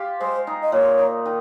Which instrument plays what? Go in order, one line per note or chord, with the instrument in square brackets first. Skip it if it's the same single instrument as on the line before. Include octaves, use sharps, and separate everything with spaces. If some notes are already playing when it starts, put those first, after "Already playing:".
Already playing: [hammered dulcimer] F4 G4
[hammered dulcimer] G#3 [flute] C5
[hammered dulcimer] D#4
[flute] D#5
[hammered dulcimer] A#2 [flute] C#5
[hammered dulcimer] D#4
D#3